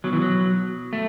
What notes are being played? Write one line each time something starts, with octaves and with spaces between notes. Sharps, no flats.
B2 F#3
E3
F#3
A3